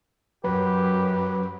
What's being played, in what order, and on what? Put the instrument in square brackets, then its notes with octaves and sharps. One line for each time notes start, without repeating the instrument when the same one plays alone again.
[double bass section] F#2 [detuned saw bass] F#3 [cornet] G4 [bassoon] B4